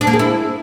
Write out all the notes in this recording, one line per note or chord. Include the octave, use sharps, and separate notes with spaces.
D4
A#3
G#4
E4